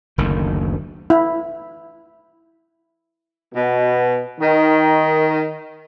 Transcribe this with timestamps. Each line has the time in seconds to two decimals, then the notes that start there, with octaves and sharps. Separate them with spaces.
0.18 F#1 D2 D#3
1.10 E4
3.54 B2
4.40 D#3